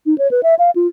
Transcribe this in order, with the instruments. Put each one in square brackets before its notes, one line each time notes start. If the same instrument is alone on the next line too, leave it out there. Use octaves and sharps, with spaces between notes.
[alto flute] D#4
C#5
B4
E5
F5
F4